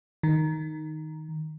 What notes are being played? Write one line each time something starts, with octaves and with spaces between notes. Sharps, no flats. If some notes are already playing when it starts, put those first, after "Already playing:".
D#3